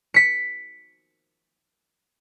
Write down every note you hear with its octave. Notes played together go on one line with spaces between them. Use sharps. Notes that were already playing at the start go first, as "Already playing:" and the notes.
B6 C#7